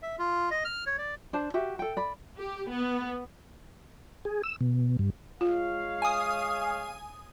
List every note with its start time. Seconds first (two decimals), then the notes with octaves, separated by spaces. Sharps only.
0.02 E5
0.19 F4
0.51 D#5
0.65 F6
0.86 C#5
0.98 D5
1.33 D4 C5 A5
1.54 F#4 G4 E5
1.79 A4 G5
1.97 D5 B5
2.38 G4
2.70 B3
4.25 G#4
4.43 E6
4.61 B2
4.99 G2
5.41 G#3 F4 C#5 F5
6.02 G#5 D#6